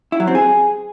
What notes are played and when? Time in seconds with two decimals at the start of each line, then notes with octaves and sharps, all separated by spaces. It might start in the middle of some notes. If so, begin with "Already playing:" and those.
0.12 E4
0.20 F#3
0.27 C4
0.35 G#4